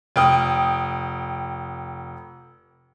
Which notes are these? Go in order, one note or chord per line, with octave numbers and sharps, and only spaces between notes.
F1 G5 D#6